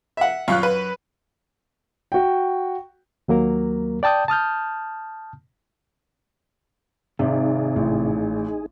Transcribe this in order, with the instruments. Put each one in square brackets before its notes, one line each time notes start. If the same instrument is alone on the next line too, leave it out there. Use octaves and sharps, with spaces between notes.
[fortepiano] E5 F#5
[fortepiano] F#2 C#6 F#6 [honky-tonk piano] F4
[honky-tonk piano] B4
[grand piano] F#4 G5
[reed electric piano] D#2 F#3 A#3 A#4
D5 G5 A5 D#6 G6
A5 D#6 F6 G6
[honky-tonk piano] G#1 [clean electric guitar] C3 [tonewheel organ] D#4 G#4
[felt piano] A1